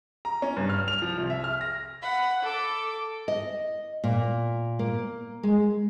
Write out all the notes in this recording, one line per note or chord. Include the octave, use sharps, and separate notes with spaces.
A#5
C#4
G2
F6
F7
F3
C2
E5
F6
A#6
F#5 B5
A4 D6
D#5
A#2
A#3
G#3